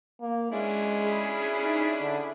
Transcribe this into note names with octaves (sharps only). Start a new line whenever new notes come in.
A#3
G#3 C#4 D4 E4
G#4 B5
D#4
D3